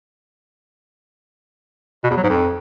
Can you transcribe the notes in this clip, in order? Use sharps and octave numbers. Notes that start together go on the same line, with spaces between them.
B2
E2
F#3
G#2
F2